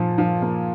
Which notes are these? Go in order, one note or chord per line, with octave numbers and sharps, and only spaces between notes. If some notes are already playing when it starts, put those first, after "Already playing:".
Already playing: A#2 F3
F3
A#3